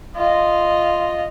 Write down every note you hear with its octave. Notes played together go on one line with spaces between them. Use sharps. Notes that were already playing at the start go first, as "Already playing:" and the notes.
F4 D#5